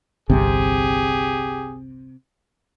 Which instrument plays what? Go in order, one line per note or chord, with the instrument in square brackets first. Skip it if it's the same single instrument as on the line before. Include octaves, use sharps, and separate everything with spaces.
[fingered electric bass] G1 C2 C4 [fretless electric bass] C3 [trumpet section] G4 G#4